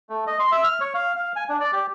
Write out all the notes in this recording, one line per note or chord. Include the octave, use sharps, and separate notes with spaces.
A3
D#5
C6
E5
F6
C#5
F5
F5
G#5
D4
D5
G4